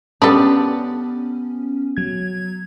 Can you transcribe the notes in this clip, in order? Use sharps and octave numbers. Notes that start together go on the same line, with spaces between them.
B3 C#4 D4 G4 A4
F#3 G#6